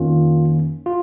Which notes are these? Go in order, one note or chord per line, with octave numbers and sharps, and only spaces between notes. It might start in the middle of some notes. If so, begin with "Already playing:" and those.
Already playing: F2 D#3 A#3 C#4 F4
F4